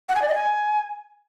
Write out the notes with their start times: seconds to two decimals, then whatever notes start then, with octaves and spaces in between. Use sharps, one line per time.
0.09 F#5
0.15 G#5
0.22 D5
0.28 D#5
0.35 G#5